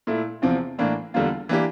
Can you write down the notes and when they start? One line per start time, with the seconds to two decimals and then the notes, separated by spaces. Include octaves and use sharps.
0.07 A#2 A3 E4
0.42 E2 C3 F3 C4
0.79 A2 E3 A#3 D4
1.14 E2 D3 G3 A#3 F4
1.49 E3 A#3 D4 G4